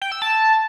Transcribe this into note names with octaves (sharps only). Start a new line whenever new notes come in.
G5
E6
A5